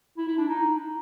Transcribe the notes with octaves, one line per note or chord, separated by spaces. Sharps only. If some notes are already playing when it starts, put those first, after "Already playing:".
E4
E4
D4
D#4